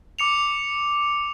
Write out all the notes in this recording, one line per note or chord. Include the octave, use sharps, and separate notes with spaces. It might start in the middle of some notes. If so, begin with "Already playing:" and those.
D6 C#7 F7